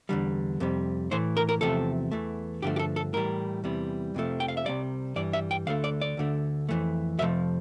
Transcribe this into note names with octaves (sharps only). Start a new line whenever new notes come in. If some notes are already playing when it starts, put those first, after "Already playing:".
E2 D3 G3
F2 C3 G3
A2 E3 A3 C5
A#4
A#4
E2 C3 F3 A3 A4
E2 E3 A3
G2 D3 F3 A3 G4
G4
A4
A4
A2 E3 G3 A#4
E2 C3 E3 G3
F2 C3 F3 A3
G5
F5
E5
C2 C3 G3 D5
G2 E3 G3 D5
E5
G5
D2 D3 A3 F5
D5
D5
D2 D3 A3
F2 E3 A3
F2 C3 F3 A3 E5